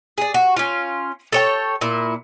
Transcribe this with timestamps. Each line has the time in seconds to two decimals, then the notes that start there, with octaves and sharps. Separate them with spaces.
0.18 G#4 D5
0.34 F#4
0.56 C#4 F4
1.32 A4 C#5 G5
1.81 A#2 E4